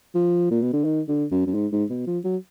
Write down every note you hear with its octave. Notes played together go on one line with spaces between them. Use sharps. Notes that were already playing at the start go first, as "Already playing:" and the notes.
F3
A#2
B2
D3
D#3
D3
F#2
F#2
G#2
G#2
B2
F3
F#3